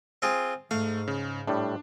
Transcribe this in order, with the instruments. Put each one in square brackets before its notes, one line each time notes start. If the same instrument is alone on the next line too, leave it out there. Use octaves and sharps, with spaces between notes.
[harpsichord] C4 F4 G#4
[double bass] G#2 [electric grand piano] A3 [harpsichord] F5
[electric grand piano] C#3
[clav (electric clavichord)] A2 G3 [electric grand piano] D4